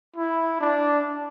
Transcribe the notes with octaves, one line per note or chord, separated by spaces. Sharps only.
E4
D4